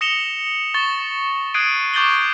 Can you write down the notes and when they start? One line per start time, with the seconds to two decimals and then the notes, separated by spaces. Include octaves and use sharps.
0.01 D#6 A#6 C#7 E7 F7 G7
0.74 C#6 A6 G7
1.54 D#6 F#6 G#6 C7 D7 D#7
1.94 C#6 D6 G6 A6 F#7 G7